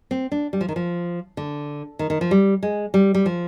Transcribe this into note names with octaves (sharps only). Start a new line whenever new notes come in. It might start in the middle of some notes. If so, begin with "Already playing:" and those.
C4
D4
G3
F3
D#3
F3
D3
D#3
D#3
F3
G3
G#3
G3
G3
F3